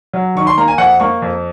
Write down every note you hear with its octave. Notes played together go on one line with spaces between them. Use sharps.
F#3
D#3 C#6
C6
A#3 A#5
G#5
F2 F#5
A#3 C#6
F2